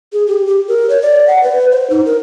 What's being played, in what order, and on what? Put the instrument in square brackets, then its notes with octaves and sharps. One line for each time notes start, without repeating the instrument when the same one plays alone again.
[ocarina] G#4
G4
G4
A#4
C#5
D5
F#5
B4
C5
D#4
A#4